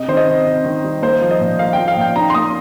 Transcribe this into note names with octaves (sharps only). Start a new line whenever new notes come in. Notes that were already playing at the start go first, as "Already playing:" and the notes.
Already playing: C3 D#5
D#3 C5
D#5
C3
C3
D#3
G3
A#3 C5
F3
D#5
A#2
A#3 F5
F3 G5
F5
A#2 G5
D#4 A#5
C6
A#3 D#6